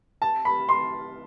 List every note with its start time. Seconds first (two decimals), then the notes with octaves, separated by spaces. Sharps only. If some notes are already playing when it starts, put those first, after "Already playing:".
0.22 A5
0.45 B5
0.69 C6